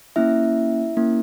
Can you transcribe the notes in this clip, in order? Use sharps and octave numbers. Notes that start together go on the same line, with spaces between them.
A#3 C#4 E4 E5
A#3 C#4 E4